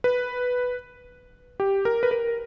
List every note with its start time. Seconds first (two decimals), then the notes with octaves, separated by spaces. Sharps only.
0.04 B4
1.60 G4
1.85 A#4
2.03 B4
2.11 A#4